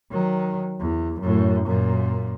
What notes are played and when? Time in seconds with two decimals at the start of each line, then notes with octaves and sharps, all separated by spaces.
0.11 D#3 F#3
0.80 E2
1.20 F#2 A2
1.65 F#2 A#2